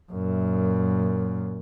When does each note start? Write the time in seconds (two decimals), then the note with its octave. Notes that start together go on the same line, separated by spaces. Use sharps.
0.12 F#2 A#2